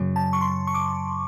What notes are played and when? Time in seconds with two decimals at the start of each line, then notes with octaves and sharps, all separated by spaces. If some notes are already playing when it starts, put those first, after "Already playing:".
Already playing: F#2 C#3 F#3
0.16 A5
0.33 C#6
0.41 C6
0.67 C#6
0.75 D6